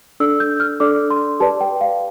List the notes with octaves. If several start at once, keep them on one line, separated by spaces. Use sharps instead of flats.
D4 A4 D5 E6
G6
F6
D4 A4 D5 D6
C6
G4 B4 D5 A5
G5
F5